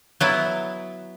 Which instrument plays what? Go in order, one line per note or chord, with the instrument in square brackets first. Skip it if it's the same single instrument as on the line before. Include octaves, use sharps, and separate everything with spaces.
[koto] F#3 B3 E4